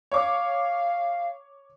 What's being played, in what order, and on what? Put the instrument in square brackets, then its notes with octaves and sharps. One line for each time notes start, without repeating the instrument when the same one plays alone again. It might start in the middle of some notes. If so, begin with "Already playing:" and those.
[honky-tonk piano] C#5 D6 [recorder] F5